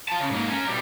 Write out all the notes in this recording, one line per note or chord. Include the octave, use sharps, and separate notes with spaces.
F4 A5
C#3
G#2 A#3
C#4 A#4
B2 G3